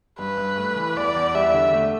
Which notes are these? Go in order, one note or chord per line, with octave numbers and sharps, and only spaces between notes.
G2 B4
G2
A3
E3
E2 D5
E2
G3 E5
D3
A3